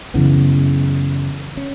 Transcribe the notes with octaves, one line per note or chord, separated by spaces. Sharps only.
F#2 C#3 E3 B3
C#4